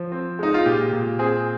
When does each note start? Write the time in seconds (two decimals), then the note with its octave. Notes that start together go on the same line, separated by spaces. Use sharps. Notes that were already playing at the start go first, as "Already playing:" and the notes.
Already playing: F3
0.12 C4
0.39 G#3 D#4
0.54 F4
0.66 A#2 G4
0.93 A#2
1.19 C4 G#4